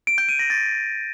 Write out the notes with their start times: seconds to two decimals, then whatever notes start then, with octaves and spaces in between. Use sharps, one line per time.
0.07 D7
0.18 G6
0.29 D#7
0.39 A#6
0.50 A6